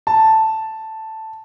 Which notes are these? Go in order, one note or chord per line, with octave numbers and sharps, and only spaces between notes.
A5